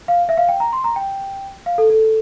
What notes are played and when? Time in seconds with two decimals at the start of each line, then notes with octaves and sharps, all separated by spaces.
0.08 F5
0.29 E5
0.37 F5
0.49 G5
0.60 A#5
0.73 C6
0.84 A#5
0.96 G5
1.66 F5
1.78 A4
1.90 A4